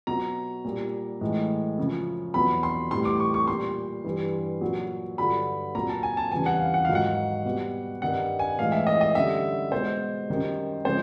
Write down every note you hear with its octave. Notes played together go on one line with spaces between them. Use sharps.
B2 F#3 A#5
A#2 G3
A2 E3 G#3
F#2 C#3 F3
E2 B2 F#3 B5
C6
A2 E3 G3 C6
D6
C#6
C#6
A#2 G3 C6
G2 E3 G3
A#2 F#3
G2 D3 F#3 B5
A#2 F#3 A#5
A5
G#5
A5
E2 C#3 E3 G3 G#5
F#5
F5
F#5
G#2 D#3 F#3 F5
F#5
B2 G3
G2 D#3 G3 F#5
G#5
A2 E3 G#3 F5
E5
D#5
D#5
F#2 D3 G3 E5
B2 G#3 C5
F#2 D#3 G3
C#3 F3 G#3 C5